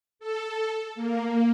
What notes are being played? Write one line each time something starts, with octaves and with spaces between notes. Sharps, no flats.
A4
A#3